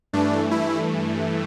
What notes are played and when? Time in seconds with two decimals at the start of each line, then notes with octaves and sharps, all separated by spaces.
0.13 G2 E3 A3 D4
0.51 E4